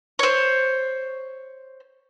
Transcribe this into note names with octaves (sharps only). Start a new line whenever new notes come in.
C5 C#5